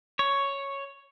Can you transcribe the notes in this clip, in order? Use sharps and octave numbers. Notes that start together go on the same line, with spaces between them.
C#5